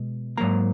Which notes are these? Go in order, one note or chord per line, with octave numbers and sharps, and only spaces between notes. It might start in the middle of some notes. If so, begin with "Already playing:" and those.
Already playing: B2 G#3
G#2 F#3 A#3 A#5